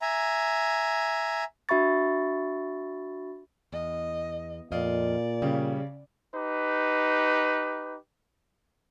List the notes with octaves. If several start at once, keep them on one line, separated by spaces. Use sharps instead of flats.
E5 G#5 A#5
D4 F#4 E5 B5 C#6 A6
E2 D#5
F2 A#2 D5 D#5 F5
C#3 G3 C#4
D#4 G4 B4